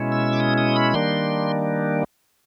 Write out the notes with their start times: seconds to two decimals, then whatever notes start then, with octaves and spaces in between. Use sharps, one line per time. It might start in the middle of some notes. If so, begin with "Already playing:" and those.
Already playing: B2 G#3 C#4 E4
0.12 E6
0.33 D6
0.40 D#6
0.58 D#6
0.76 B5
0.94 D#3 G3 A#3 D4 C6